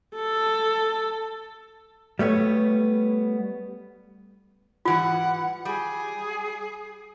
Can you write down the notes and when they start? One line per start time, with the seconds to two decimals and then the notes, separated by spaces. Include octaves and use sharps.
0.16 A4
2.19 G3 A3 B3 C#5
4.85 G#2 E3 G3 F4 F#5
5.65 G3 G#4